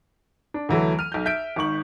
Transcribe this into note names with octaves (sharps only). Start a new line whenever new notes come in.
D4
D2 E3 F#3 A3
F6 D#7
B1 G6
E5 G6 B6 D7
G#1 D#3 C#6 F#7